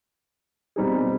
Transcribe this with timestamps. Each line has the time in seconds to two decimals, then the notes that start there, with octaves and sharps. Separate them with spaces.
0.76 B2 G3 C4 D#4 G#4